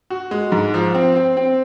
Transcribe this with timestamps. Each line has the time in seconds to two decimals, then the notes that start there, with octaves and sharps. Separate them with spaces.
0.10 F#4
0.31 G#3
0.52 G#2
0.74 F3
0.95 C4
1.16 C4
1.37 C4